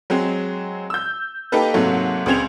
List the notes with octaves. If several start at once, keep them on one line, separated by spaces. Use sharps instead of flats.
F#3 G#3 C4
E6 G6
A#3 D#4 G4 A4 B4
G#2 C3 F#3 A3 A#3
C#2 G#3 C4 G#6 F7